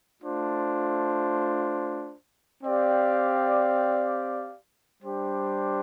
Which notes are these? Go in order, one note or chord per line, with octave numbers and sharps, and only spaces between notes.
A3 D4 F4 C5
C4 G4 D5 F5
G3 D4 G4 C5